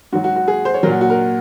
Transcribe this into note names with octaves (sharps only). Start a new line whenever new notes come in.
G#2 F#3 F#4
F#4
F#4
G#4
C5
C#5
A#2 F#3 F#4 A#4
F#4
A#4